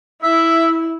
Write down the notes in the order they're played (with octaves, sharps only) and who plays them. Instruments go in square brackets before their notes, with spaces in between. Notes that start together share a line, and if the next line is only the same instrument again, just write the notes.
[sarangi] E4 [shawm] E5